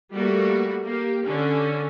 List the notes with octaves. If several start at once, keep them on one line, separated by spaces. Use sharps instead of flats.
G3 A3 A#3 F#4
A#3 G4
D3 C#4